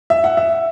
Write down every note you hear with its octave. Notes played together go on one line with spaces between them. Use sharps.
E5
F#5
E5